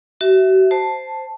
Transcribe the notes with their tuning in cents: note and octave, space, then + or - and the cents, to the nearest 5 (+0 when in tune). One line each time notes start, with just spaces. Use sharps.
F#4 +40 E5 +0
C5 -5 A5 +0